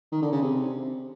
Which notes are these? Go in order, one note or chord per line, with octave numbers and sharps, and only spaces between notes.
D#3
D3
C#3
C3